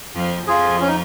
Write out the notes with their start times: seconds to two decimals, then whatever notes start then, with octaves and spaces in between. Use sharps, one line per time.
0.15 F2 F3
0.47 F2 F3 F4 G#4
0.80 C#4
0.88 D#4